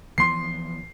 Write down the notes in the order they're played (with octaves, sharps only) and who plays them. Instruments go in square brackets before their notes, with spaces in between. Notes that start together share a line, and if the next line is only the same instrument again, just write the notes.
[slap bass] E3 F3 B3 [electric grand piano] C6 C7